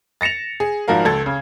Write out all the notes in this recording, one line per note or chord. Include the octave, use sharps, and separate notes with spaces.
A6 A#6 C#7 E7 F7
G#4
G#1 G#2 F3 F#4 A#4 F5
C#2 A4 G#6
C#3